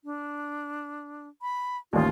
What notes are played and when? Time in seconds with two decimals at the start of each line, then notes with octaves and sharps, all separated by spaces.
0.04 D4
1.42 B5
1.93 A1 D#2 F4